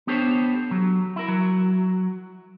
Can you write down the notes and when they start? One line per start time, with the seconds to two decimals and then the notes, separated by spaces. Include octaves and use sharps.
0.07 B3 D4 G4 A4 C5 C#5
0.71 F#3
1.16 E4 A#4
1.28 F#3